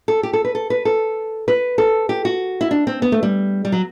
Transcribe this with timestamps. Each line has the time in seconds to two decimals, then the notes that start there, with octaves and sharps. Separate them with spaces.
0.08 A4
0.23 G4
0.33 A4
0.45 B4
0.55 A4
0.70 B4
0.85 A4
1.48 B4
1.78 A4
2.09 G4
2.25 F#4
2.61 E4
2.71 D4
2.87 C4
3.02 B3
3.12 A3
3.23 G3
3.65 G3
3.72 F#3